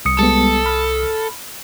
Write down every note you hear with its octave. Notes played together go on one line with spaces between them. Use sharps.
C2 D#6 C#7
G3 G#3 B3 A4
B5 F6